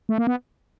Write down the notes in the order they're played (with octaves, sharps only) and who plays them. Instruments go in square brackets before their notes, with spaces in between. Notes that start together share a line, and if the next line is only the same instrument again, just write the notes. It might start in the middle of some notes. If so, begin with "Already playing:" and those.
[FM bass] A3
A#3
B3